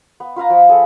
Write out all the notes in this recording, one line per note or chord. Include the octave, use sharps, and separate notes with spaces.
B3
F4 B4 F5 A#5
F3 B3 B5
G#4 A4